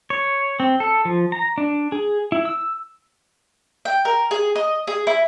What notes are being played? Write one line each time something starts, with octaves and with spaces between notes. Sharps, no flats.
C#5
C4
A4
F3
A#5
D4
G#4
E4
E6
G5
A#4
G#4
D#5
G#4
E4